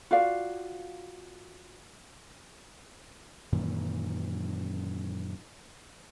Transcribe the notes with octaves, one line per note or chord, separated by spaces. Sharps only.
F4 F#4 D5 F5
F#2 A#2 D#3 E3